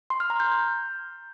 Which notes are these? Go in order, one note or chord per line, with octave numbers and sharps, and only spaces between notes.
C6
F6
A#5
G6